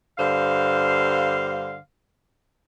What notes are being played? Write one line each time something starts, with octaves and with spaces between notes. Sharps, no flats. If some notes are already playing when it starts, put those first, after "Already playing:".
G2 D3 C5 F5